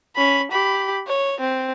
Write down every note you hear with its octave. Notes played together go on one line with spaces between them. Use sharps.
C#4 B5
G4 B5
C#5
C4